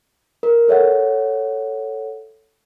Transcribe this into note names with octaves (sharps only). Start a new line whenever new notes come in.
A#4
A4 C#5 E5 F#5